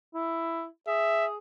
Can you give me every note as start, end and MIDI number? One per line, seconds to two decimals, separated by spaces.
0.14 0.65 64
0.87 1.37 68
0.87 1.26 76